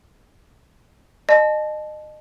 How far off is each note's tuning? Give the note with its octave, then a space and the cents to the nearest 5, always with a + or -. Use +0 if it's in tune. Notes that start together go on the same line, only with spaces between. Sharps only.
D#5 -30 A5 -30